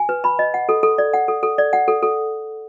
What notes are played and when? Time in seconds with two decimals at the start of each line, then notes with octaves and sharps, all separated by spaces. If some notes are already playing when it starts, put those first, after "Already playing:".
Already playing: G#5
0.09 B4
0.24 B5
0.39 D#5
0.54 F#5
0.69 A4
0.83 A4
0.98 D5
1.13 F#5
1.28 A4
1.43 A4
1.58 D5
1.73 F#5
1.88 A4
2.03 A4